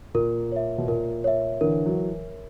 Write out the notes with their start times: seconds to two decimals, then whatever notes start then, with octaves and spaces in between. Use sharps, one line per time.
0.14 A#2 A#4
0.52 C#5 E5
0.78 B2
0.88 A#2 A#4
1.24 C#5 E5
1.61 D3 E3 A#4
1.85 E3 F#3